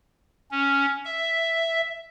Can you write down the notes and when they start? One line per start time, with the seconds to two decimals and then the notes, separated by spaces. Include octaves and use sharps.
0.51 C#4
1.05 E5